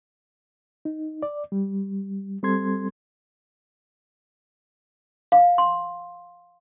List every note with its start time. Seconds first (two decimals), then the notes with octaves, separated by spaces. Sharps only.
0.85 D#4
1.23 D5
1.52 G3
2.43 G3 C4 A4 C6 G#6
5.32 F5
5.58 C6